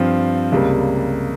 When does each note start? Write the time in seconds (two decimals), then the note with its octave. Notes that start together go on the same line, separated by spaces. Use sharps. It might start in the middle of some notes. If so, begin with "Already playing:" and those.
Already playing: G2 F3 C4 F4 C5
0.52 C#2 C3 G3 A#3